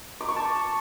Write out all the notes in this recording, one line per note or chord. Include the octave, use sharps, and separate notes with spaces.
D6
C#6
A5